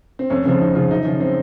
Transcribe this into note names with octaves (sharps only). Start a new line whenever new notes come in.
C4
F2 C#4
C#3 F3 C4
F2 D#4
C#3 F3 F4
F#2 D#4
C#3 F3 C#4
C4